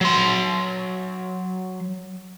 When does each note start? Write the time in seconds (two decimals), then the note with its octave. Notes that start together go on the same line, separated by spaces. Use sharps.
0.01 F#3 C6